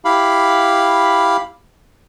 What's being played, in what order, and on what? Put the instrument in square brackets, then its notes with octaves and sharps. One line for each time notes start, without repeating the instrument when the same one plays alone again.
[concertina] E4 G4 F5 B5